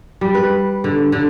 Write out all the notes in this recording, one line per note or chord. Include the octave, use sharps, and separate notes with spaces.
G3
B4
D3
D3